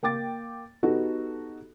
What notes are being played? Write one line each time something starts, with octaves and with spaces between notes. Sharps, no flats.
A#3 G5 D6 A6
B3 D#4 F#4 G4 A4